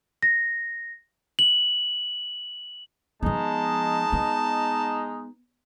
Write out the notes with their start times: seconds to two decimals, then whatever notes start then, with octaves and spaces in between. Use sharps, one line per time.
0.23 A#6
1.39 F#7
3.23 F3 G#3 B3 D#4 A5
4.12 B3